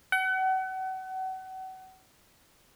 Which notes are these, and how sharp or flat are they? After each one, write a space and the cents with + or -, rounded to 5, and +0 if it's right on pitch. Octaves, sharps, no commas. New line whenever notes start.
F#5 +35